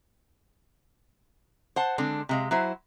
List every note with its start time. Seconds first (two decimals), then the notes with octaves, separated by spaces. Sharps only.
1.76 C5 F#5 A5
1.98 D3 G#3 C4 D4
2.29 C3 G#3 F5
2.51 F#3 E4 C5